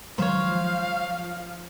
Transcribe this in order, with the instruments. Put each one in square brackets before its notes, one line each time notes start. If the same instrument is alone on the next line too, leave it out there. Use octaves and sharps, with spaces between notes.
[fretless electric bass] D#3 F#3 G#3 [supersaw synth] F3 [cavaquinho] C5 C#5 [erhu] F5